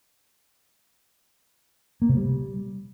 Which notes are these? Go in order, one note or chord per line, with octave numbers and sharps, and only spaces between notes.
A#3
C3
G3